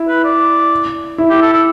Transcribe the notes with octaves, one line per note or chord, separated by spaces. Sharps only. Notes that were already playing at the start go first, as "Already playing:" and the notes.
Already playing: E4
B4
D5
E4
G4
A4
A4